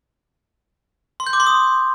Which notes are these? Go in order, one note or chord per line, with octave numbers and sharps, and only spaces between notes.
C6
G6
D6
C6
D#6